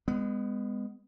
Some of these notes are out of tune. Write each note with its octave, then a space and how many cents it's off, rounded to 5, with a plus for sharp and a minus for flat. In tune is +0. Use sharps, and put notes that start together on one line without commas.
G#3 -25 B3 +20